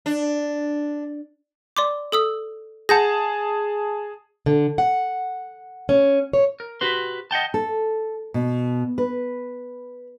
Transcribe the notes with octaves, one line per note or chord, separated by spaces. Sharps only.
D4
D5 C6 D6
A4 D#6 E6
G#4 F#5 A5 G6 A#6
D3
F#5
C#4
C#5
A#4
F#4 G4 B4 C6
D#5 F#5 G5 A5
A4
B2
B4